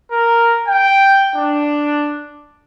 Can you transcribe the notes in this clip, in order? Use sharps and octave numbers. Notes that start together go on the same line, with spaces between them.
A#4
G5
D4